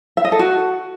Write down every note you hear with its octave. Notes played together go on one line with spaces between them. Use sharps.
E5
D#5
A4
F#4